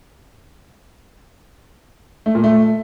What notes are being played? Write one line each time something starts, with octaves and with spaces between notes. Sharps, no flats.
A3
A#2
A3